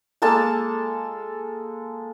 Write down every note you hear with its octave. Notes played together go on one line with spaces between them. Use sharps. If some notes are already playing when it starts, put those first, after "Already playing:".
G#3 A#3 A4 A5